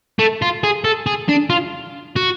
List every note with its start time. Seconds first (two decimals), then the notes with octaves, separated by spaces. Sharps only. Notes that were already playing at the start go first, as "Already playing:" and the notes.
0.19 A3
0.42 F4
0.63 G#4
0.84 A4
1.06 G#4
1.29 D4
1.50 F4
2.16 F#4